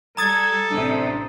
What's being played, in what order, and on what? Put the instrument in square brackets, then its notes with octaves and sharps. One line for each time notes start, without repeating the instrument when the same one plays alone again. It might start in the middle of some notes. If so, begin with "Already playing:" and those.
[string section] G3 [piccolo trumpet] A4 [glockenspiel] A#5 D#6 A6 [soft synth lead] G#6
[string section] A1 C3 [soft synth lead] D4